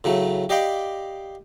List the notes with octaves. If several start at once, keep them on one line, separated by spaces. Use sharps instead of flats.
A2 C#3 F#3 A3
G4 D5 D#5 F5 G5 B5